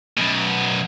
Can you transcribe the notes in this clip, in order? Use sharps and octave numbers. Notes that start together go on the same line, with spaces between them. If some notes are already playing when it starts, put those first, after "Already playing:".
F#2 B2